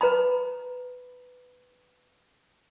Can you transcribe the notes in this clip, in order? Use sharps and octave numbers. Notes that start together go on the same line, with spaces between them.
B4 A#5 B5